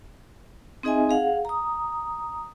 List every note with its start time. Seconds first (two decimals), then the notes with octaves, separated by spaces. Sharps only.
0.83 C4 D#4 G#4 D#5 E5 G#5
1.09 G#4 F5 F#5
1.45 A#5 D#6